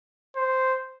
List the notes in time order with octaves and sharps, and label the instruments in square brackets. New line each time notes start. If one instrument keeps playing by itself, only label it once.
[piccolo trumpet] C5